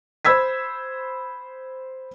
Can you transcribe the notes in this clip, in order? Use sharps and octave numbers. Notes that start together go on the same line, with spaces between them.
C5 B5 E6 G#6 B6